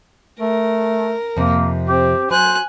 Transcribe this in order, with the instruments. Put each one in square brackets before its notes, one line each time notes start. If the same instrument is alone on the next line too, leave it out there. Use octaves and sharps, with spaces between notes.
[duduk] A3 [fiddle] A#4
[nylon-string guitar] F2 C3 [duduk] A#3
[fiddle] C4 [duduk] G4
[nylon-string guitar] F#3 [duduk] C5 [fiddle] G#5 F#6